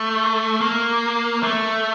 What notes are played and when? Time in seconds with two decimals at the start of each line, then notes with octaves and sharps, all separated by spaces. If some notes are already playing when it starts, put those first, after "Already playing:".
Already playing: A3
0.61 A#3
1.43 A3